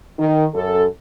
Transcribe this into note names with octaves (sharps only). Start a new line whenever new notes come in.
D#3
F#2 A4